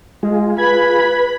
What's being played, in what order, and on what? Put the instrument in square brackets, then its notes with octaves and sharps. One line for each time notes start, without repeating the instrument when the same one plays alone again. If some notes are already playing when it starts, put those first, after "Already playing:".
[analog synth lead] G#3 [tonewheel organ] F4 G#4
[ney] B4 [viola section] B5 [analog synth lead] G#6